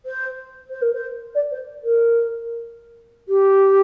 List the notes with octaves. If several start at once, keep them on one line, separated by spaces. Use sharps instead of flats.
C5
C5
A#4
C5
D5
C5
A#4
G4